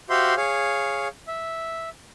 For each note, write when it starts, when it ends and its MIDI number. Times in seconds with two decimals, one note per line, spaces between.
0.10 0.35 66
0.10 0.35 67
0.10 0.35 72
0.10 0.35 76
0.10 0.35 77
0.10 0.35 84
0.37 1.08 68
0.37 1.08 73
0.37 1.08 77
1.28 1.90 76